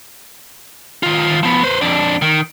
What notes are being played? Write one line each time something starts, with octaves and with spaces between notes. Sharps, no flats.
D#3 F4
F3 B3
B4 C5
F2 D4
D#3